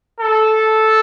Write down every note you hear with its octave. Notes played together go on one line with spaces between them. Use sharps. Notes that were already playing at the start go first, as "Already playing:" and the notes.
A4